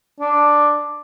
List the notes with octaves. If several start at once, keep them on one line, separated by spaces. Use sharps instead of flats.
D4